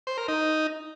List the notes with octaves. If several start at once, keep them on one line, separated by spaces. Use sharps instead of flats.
C5
A#4
D#4